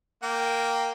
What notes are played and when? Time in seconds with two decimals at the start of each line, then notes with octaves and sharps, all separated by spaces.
0.23 A#3 G5